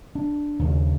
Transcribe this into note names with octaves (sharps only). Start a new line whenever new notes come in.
D4
D#2 C#3